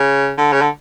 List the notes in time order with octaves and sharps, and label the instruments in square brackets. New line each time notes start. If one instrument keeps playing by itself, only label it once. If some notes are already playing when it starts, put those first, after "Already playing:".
Already playing: [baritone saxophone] C#3
D3
C#3
D3